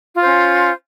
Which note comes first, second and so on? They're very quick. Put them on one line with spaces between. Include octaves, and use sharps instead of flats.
F4 C5 C#4